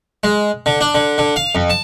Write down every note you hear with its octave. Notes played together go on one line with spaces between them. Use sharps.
G#3
D3
D4
D3
D3
F5
F2
A5